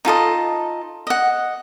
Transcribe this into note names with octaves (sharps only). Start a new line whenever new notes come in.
D#4 F4 A4 D#5
D#5 F#5